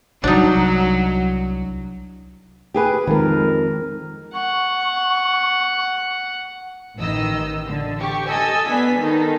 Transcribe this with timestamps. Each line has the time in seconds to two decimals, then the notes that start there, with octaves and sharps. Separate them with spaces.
0.24 C2 F#3 D4 D#4
2.74 G4 G#4 B4
3.07 F2 D#3 G#3 A#4
4.34 F#5 C#6
6.98 A1 D#3 E3 D#5 E6
7.67 D3
8.00 G4 C#6
8.28 A4 D#5 G#5 E6
8.67 B3 D4 G#5 B6
9.00 D#3 D#4 A4